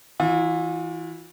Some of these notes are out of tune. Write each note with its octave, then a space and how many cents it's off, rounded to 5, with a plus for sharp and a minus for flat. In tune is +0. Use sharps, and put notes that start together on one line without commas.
E3 -10 F4 +40